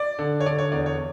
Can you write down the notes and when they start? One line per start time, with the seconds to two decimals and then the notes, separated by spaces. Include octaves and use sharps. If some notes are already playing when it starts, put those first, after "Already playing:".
Already playing: D5
0.19 D3
0.40 C#5
0.46 D3 D5
0.58 C#5
0.72 E2 D5
0.86 C#5